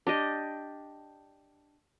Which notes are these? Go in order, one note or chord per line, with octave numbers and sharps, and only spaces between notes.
D4 G4 D#5